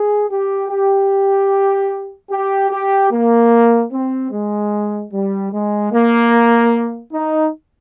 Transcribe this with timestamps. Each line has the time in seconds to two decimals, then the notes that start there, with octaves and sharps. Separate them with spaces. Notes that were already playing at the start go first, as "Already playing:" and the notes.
Already playing: G#4
0.30 G4
0.69 G4
2.30 G4
2.71 G4
3.11 A#3
3.91 C4
4.31 G#3
5.12 G3
5.52 G#3
5.92 A#3
7.12 D#4